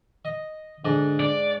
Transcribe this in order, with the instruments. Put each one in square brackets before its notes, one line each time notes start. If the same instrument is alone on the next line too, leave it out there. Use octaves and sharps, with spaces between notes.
[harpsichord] D#5
[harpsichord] G#2 D4 D#5 [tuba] D3
[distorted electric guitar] D5